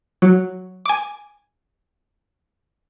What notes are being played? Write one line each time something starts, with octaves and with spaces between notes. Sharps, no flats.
F#3
G#5 D6